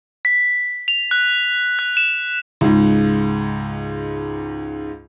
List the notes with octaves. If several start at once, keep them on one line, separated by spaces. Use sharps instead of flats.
B6
F7
F#6
F#6
E7
C#2 G#2